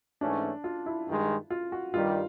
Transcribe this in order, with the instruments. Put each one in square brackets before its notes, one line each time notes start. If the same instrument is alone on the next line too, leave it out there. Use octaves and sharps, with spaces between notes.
[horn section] G#2 E3 A3 C#4 [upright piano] D4
[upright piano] F4
E4
[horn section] G2 D#3 G#3
[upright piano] F4
F#4
[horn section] G2 D#3 G3 [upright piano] F4